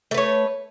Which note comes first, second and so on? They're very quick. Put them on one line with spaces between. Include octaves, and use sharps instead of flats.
A3 B4 C#5